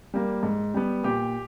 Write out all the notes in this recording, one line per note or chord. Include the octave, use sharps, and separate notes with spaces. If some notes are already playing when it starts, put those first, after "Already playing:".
G3 A#3
G#2
G3 B3
A#2 G4